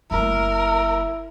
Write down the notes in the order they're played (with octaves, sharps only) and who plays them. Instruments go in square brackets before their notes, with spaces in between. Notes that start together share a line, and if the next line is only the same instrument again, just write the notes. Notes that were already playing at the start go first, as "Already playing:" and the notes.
[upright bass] F#1 A3 [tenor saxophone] E4 [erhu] A#4